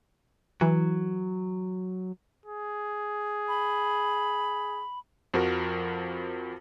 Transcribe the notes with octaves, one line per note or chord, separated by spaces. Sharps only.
E3 F#3
G#4
B5
F2 F3 F#4 A#4